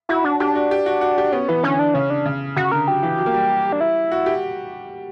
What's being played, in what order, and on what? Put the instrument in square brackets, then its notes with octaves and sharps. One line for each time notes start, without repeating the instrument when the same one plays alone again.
[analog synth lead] E4 [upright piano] F#4
[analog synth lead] D4
[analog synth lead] D4 [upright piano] G4
[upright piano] F#4
G4
F#4
F#4
G4
[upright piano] B3 [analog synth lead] C#4
[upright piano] E3 [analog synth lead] B3
[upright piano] D3 [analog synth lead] C#4
[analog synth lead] D4
[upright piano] C#3 [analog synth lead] C#4
[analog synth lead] D4
[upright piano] C#3
[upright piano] C#3 [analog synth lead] F#4
[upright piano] D3 [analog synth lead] A#4
[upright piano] F#3 [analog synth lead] G4
[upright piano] E3
F#3
A#3
G3
[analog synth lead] D4
E4
[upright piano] F#4
G4